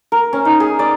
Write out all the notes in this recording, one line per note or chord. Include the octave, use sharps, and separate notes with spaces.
A#4
C#4
D#4
G#4
D5